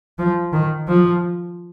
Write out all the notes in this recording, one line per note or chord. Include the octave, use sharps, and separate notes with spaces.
F3
D#3
F3